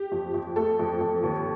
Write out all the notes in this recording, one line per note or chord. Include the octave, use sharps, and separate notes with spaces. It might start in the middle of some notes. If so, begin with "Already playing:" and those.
Already playing: G4
F2
F2
A3 A4
F2
F2
D#2